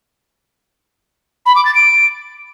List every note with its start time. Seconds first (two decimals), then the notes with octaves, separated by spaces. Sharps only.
1.46 B5
1.55 D6
1.65 A6
1.75 D7